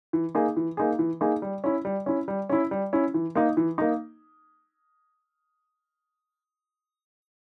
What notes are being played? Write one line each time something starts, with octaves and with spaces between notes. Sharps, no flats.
E3
A#3 D#4 G#4
E3
A#3 D#4 G#4
E3
A#3 D#4 G#4
G3
C#4 E4
G3
C#4 E4
G3
C#4 E4
G3
C#4 E4
E3
A#3 D#4
E3
A#3 D#4